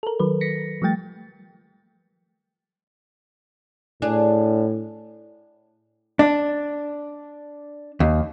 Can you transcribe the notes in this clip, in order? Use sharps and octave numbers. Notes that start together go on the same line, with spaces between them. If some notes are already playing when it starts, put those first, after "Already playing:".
A4 A#4
D#3 F#3 B4
A#6 B6 C#7
F3 G3 A3 G5 A6
A2 D4 G#4
D4
D#2